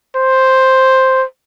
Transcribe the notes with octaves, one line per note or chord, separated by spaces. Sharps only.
C5